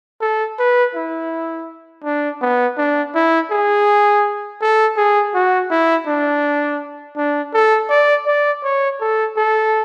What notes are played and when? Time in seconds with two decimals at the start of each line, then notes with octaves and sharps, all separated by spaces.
0.21 A4
0.59 B4
0.95 E4
2.04 D4
2.41 B3
2.77 D4
3.15 E4
3.51 G#4
4.61 A4
4.97 G#4
5.34 F#4
5.70 E4
6.07 D4
7.17 D4
7.54 A4
7.90 D5
8.26 D5
8.63 C#5
9.00 A4
9.37 A4